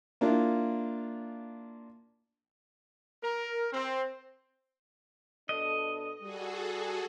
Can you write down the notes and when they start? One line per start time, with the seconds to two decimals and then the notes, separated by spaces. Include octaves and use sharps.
0.21 A#3 D4 E4 F4
3.22 A#4
3.73 C4
5.49 B2 D4 A4 D#5
6.21 G3 F#4 G#4 A4